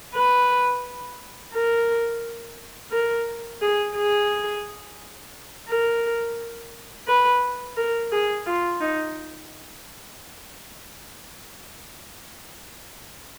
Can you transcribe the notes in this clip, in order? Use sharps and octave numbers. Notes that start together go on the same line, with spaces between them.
B4
A#4
A#4
G#4
G#4
A#4
B4
A#4
G#4
F4
D#4